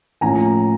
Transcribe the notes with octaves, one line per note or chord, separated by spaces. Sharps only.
A2 F3 A#3 C#4 G#5 A#5